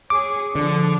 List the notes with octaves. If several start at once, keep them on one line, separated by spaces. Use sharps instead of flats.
G#4 C#5 D6
D3 F3 D4